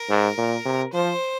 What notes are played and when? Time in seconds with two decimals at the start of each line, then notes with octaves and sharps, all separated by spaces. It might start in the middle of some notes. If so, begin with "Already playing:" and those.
Already playing: A#4
0.09 G#2
0.38 A#2
0.65 C3
0.93 F3 C5